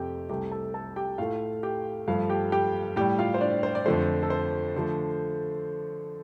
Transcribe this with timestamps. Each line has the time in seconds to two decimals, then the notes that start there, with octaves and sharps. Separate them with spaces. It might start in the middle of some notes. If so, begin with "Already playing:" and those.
Already playing: F2 C3 A3 G4 G5
0.29 C2 C3 A3 G4 G5
0.51 A4 A5
0.74 A4 A5
0.96 G4 G5
1.18 A2 A3 F4 F5
1.63 G4 G5
2.08 G2 F3 A3 F4 F5
2.30 G4 G5
2.52 G4 G5
2.96 A2 G3 G4 G5
3.19 F4 F5
3.34 C5
3.41 D4 D5
3.63 C5
3.75 D5
3.86 F2 D3 F3 A3 C5
4.23 A4
4.30 C5
4.76 D3 F3 A3